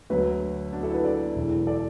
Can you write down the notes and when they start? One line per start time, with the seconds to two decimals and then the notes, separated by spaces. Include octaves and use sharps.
0.10 D2 D3 F#3 F#4 B4
0.73 D4 F#4
0.83 E4 A4
0.94 F#4 B4
1.04 A4 D5
1.36 E1 E2 E3
1.67 A4 D5